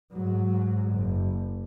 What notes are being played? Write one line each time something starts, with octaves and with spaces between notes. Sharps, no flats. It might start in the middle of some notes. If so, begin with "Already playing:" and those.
G#2 F#3
F#1